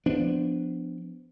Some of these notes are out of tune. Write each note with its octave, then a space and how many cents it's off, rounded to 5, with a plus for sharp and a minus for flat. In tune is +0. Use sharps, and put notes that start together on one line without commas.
F3 +0 B3 +15 D4 +0